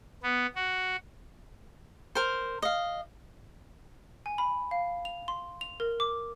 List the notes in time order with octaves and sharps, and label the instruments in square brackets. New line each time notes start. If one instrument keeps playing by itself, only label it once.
[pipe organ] B3
F#4
[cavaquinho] A#4 C5
D#5 F5
[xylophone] G#5
B5
F5
F7
C6
F7
A#4
D6